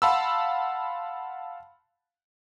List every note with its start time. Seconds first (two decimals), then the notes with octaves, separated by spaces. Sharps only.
0.02 F5 F#5 A5 B5 C6 E6